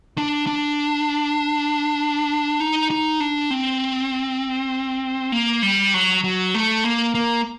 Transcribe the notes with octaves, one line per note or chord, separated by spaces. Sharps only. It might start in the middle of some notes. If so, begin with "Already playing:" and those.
D4
D4
D#4
D#4
D4
C4
A#3
G3
F#3
F#3
A3
A#3
A#3